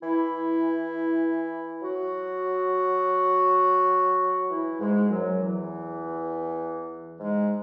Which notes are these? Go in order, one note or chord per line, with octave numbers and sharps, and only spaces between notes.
E3 E4
F#3 F#4
E3 E4
G#2 G#3
F#2 F#3
E2 E3
G#2 G#3